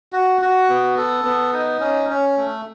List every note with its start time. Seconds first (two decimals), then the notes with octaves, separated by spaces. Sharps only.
0.13 F#4
0.42 F#4
0.69 B3
0.97 A4
1.24 B3
1.53 D#4
1.80 C#4
2.09 C#4
2.37 A3